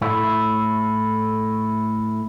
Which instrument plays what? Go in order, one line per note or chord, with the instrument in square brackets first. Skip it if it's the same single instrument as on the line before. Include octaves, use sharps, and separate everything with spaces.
[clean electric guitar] A2 A3 E4